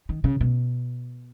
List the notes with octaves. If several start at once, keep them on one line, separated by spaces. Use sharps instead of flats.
D#3
C#3
B2